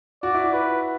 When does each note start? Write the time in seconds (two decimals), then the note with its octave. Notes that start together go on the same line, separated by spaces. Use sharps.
0.23 F#4 D5
0.34 E4
0.46 F#4
0.53 B4